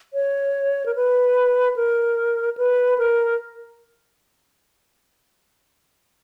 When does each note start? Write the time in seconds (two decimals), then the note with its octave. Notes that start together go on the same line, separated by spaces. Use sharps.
0.14 C#5
0.86 A#4
0.95 B4
1.76 A#4
2.57 B4
2.98 A#4